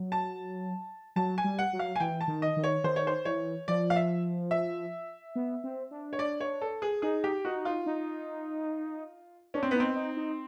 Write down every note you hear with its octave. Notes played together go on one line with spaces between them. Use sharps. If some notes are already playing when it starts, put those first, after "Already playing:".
Already playing: F#3
A5
F#3 A5
G#5
G3
F#5
F#3
F5
G#5
E3 G5
A5
D#3
D#5
D#3
C#5
D#3 C5
C#5
C5
E3 C#5
F3 D5
F5
E5
E5
B3
C4
D4
C#5
D5
C#5
A4
G#4
D#4 G#4
G4
D#4 F#4
F4
D#4
C#4 D4
C4
B3
C4 D#4
D#4
D#4